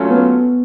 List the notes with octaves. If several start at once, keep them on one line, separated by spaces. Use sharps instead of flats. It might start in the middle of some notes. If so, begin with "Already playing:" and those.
Already playing: F#3 A3 C#4 F4
B3